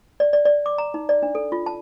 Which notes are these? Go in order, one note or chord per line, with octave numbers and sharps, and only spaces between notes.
D5
D5
D5
D6
A#5
D#4
D5
D4
A4
F4
A5